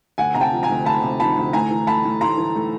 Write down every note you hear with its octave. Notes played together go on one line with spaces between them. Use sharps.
D2 F#5 G#5
C3 A#5
G5 A5
F3
G#5 A#5
D2
D2 A5 B5
C3
F3 A5 B5
D2
A2 G#5 A#5
E3
A3 A5 B5
A2
A2 A#5 C6
E3
A3